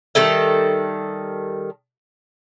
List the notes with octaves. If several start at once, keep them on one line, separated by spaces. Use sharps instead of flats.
D#3 G3 A4 E5